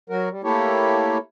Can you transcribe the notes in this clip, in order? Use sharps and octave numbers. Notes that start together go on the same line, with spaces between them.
F#3 F#4 A#4
G3
A3 A#3 E4 G4 A4 C#5